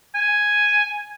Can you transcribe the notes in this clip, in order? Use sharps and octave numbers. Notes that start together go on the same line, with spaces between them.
G#5